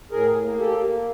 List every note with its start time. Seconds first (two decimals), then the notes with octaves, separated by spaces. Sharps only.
0.11 A2 G#4 A#4
0.43 A#3
0.59 G4 A4
0.75 A#3